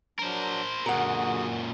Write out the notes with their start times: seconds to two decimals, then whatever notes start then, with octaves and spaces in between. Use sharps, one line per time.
0.19 F#3 D4 A#4 C5
0.86 F#2 A#2 D3 F#4 G#4 A#4 F#5